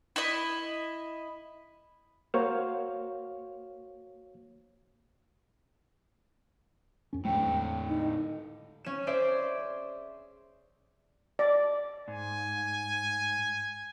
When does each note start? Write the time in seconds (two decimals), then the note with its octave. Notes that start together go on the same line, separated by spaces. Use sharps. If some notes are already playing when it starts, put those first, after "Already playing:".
0.16 E4 D#5
2.34 A#3 F#4 C5 C#5 F5
7.13 F2 C#4
7.25 E2 A2 D3 G#3 G5
7.87 D#4
8.85 C#4 E7
9.07 G#4 C5 D5 E5
11.39 D5
12.08 G#2 G#5